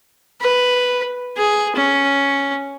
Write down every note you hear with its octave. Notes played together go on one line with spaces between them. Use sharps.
B4
G#4
C#4